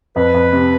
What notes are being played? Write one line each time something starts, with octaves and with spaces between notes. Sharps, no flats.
F2 B4
F2
C3